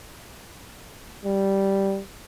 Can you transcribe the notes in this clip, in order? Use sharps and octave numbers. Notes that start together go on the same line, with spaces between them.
G3